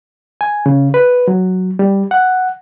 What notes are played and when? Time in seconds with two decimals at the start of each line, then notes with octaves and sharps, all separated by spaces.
0.41 G#5
0.66 C#3
0.94 B4
1.28 F#3
1.79 G3
2.11 F#5